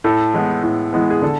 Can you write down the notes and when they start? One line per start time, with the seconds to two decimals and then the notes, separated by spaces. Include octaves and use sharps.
0.04 A2 A4
0.34 E3 G#3 B3
0.63 A2
0.93 E3 G#3 B3
1.10 G#4
1.22 D3 A4